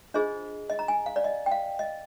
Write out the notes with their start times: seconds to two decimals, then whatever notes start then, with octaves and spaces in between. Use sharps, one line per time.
0.14 D4 F4 G#4 C5 D#5
0.70 D#5
0.79 A#5
0.88 G#5
1.06 F5
1.16 D5
1.24 D#5
1.46 G5
1.52 F5
1.79 D#5